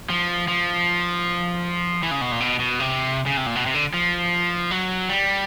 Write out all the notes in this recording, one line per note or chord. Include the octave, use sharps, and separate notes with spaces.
F3
F3
E3
C#3
B2
A#2
B2
B2
C3
C#3
C3
A#2
B2
C3
D3
F3
F#3
G3